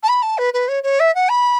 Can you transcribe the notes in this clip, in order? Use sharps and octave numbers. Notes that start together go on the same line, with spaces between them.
A5
B5
A5
B4
B4
C#5
C#5
E5
F#5
B5